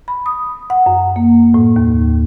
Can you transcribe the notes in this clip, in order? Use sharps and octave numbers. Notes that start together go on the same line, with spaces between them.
B5
D#6
F#5
F#2
A#3
A2
D#2